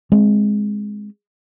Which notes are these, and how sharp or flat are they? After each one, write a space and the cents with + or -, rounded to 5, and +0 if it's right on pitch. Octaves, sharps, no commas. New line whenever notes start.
G#3 +0 C4 +20